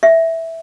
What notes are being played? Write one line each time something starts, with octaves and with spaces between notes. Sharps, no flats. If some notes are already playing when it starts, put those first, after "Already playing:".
E5